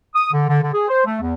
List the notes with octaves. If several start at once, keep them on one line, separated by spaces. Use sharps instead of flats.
D#6
D3
D3
D3
G#4
C5
A3
E2